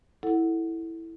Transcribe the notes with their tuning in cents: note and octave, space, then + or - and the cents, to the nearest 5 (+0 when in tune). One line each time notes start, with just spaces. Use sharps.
E4 -5 A4 +0 F#5 +0